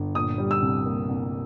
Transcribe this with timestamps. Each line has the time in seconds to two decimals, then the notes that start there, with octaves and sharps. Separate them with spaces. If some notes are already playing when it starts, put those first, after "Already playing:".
Already playing: G1
0.15 A#2 D#6
0.38 G3
0.51 E6
0.62 C2
0.85 A#3
1.09 C2